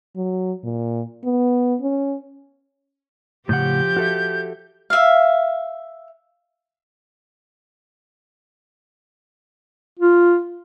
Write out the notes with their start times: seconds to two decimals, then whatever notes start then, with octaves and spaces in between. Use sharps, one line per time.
0.16 F#3
0.63 A#2
1.25 B3
1.81 C#4
3.49 A2 C#3 F3 G4 F#5 G6
3.97 F#4 A4 E5
4.90 E5 F5
9.99 F4